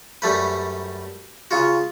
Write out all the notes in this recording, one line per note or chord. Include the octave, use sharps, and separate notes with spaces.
F#2 G3 A3 B4
C#3 F4 F#4